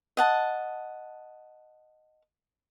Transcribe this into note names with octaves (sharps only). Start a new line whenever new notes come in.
D#5 F#5 A5